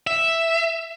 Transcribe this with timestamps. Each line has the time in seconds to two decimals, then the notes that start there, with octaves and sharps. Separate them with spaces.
0.07 E5